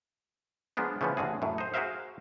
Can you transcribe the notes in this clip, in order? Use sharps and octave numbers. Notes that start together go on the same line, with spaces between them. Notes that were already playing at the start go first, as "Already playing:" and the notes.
F3 G#3 A#3 B3 D4
C#3 E3 F3 B3 C#4
A1 D3 F#4 G#4
F#2 A2
D#4 C5
F#4 G#4 A#4 C5 E5 F5